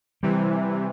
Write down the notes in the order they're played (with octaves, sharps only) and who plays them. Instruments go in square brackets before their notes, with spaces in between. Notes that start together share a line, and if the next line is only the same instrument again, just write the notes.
[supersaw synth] C3 E3 [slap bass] G3